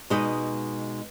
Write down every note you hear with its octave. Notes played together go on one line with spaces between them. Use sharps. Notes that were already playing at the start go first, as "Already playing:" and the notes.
B2 G#3 D#4 B4 D#5